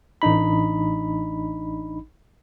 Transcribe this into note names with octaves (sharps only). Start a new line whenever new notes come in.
A1 D4 D#4 B5